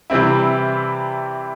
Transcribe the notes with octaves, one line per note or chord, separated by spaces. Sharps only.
C3 E3 G3 C4 E4